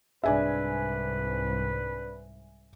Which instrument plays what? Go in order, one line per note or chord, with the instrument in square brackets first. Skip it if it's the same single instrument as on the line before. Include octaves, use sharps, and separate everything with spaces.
[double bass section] C2 G#2 [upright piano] D4 G#4 [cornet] B4 [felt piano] E5 G#5